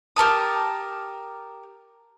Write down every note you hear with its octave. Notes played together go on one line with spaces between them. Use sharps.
G4 A#4 A5 D#6